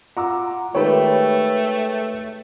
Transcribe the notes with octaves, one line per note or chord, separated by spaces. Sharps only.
F4 F#5 A#5 D6 E6
D#3 G#3 A3 G4 B4 C#5 G5